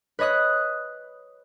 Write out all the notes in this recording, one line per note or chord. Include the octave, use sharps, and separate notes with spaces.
B4 C#5 D#5 D#6 F#6